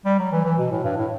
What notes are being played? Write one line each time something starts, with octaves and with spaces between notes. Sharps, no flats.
G3
F#3
E3
E3
B2
A2
G2
A2